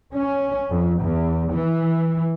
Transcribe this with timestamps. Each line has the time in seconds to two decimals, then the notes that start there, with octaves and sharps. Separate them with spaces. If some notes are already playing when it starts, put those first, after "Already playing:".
0.13 C#4
0.70 F2
1.01 E2
1.54 E3